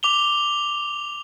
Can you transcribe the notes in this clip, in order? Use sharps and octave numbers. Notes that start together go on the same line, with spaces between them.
D6 F7 G7